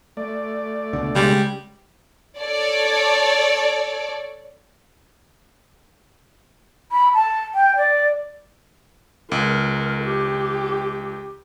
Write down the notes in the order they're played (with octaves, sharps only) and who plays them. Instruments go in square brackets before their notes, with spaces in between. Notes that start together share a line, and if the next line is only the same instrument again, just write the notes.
[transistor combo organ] A3 D5
[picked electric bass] C#2 B2 D3
[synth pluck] C#3 G#3 [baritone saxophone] G3
[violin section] A4 C#5 D5
[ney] B5
A5
G5
D5
[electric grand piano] C#2 [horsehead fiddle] A#4
[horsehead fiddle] G4